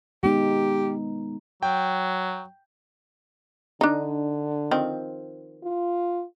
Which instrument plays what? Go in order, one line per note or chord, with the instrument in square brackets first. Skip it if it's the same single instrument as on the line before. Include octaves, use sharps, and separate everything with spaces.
[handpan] G#3 B3 D#4 [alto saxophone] G4
[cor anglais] F#3 [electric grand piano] G5
[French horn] D3 [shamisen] D4 D#4
[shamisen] D#3 F3 C4
[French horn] F4